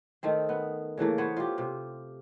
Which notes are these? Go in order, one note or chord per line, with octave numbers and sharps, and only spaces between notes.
D#3 A3 C4
B3
C#3 E3 A3 A#3
B3 C5 C#5
F4 G4
C3